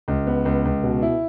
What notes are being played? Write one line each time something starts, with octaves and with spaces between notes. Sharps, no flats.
C#2
B3
C#2
C#2
B2
E4